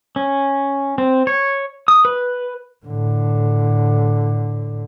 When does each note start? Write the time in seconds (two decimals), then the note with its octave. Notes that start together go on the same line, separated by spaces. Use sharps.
0.16 C#4
0.98 C4
1.27 C#5
1.88 D#6
2.05 B4
2.86 A2 D3